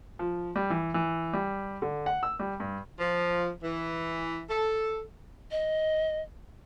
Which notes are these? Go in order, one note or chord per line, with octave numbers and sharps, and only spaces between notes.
F3
G3
E3
E3
G3
D3
F#5
E6
G3
G2
F3
E3
A4
D#5